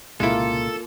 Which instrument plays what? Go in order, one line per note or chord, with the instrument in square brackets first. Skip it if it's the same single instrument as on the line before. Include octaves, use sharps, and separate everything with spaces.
[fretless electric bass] C2 A#2 C#3 [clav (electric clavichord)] G#3 E4 [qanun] A#3 F4 [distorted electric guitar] A4